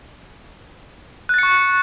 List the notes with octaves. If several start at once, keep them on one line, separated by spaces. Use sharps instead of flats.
C#6 F#6 A6 C#7